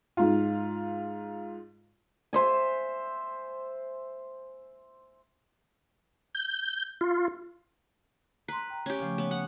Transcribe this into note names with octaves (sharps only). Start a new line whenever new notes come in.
G#2 F4
C5 E5 G#5
G6
F4
B4 A#5 C6
G5 A#5
C#4 G4
C#3 F3 A3
B3 C#5
F#5